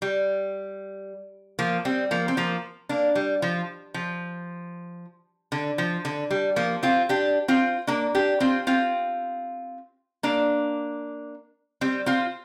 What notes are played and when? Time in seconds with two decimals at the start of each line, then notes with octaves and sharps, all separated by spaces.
0.02 G3
1.59 F3 A#3
1.85 G3 C4
2.11 F3 A#3
2.28 C4
2.37 F3 A#3
2.89 A#3 D4
3.15 G3
3.42 F3
3.94 F3
5.52 D3
5.78 F3
6.05 D3
6.30 G3
6.56 F3 A#3
6.83 C4 F4
7.09 D4 G4
7.48 C4 F4
7.87 A#3 D4
8.15 D4 G4
8.40 C4 F4
8.67 C4 F4
10.23 A#3 D4
11.81 G3 C4
12.06 C4 F4